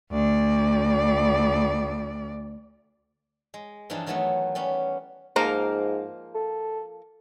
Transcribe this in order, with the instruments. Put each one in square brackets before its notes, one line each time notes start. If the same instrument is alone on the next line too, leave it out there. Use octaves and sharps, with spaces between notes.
[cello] D2 D5
[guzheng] G#3
G2 E3 F3 D4 D#4
D#3 E3 F#3 A3 B3 D#4
G3 B3 C#4
[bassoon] G#2 [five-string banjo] F3 A#3 A#4
[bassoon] A4